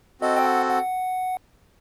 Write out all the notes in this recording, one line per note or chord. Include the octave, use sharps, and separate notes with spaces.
C4 F#4 A4 D#5
G5
F#5
F#5